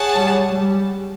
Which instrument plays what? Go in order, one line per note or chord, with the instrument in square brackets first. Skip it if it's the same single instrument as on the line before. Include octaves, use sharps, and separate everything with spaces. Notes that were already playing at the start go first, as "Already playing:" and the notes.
Already playing: [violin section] G#4 C#5 F#5 A5
[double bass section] G3
G3